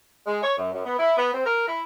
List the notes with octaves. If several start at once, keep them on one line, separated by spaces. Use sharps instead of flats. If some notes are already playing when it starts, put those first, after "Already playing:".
G#3
C#5
F#2
F#2
B3
E4
B3
C4
A#4
E4